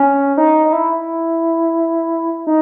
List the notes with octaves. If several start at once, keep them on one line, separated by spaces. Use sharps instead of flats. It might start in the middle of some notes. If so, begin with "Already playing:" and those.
Already playing: C#4
D#4
D#4
E4
D#4